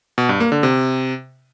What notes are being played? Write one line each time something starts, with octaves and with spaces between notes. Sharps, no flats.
B2
G2
A#3
D3
C3